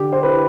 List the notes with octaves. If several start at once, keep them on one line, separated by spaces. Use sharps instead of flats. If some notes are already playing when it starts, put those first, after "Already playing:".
Already playing: D3 G4
C5
E4 B4